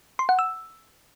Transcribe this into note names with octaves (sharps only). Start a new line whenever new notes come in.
C6
F#5
E6